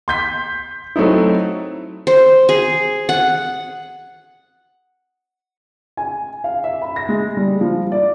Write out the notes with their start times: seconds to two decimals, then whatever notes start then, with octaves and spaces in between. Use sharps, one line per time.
0.08 C6 G6 B6
0.96 F#3 A3 C4 D#4 E4
2.07 C5
2.49 G#4
3.09 F#5
5.97 G#5
6.44 F5
6.64 E5
6.82 B5
6.96 A#6
7.09 G#3
7.37 G3
7.61 F3
7.92 D5